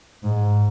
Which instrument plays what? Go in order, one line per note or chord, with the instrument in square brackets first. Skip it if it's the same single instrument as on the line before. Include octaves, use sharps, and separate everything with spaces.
[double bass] G#2